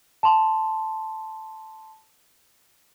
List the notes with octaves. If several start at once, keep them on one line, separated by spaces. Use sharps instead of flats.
A5 C6